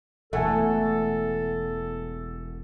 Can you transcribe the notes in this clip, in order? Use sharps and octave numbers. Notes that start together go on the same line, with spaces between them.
E1 E2 A3 A4 E5 F#5 G#5